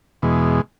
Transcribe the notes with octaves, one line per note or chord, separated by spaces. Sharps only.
E2 B2 G#3